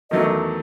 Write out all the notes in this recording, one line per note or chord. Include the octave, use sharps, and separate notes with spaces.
E2 D#3 F#3 A3 D#5